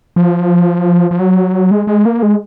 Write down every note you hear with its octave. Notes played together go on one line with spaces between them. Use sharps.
F3
F3
F#3
G#3
G#3
A#3
G#3